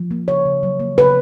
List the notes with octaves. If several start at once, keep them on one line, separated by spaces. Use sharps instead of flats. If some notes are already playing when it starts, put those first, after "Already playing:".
Already playing: F3
A#3
C#3 C#5
C#3
F#3
A#3
C#3 B4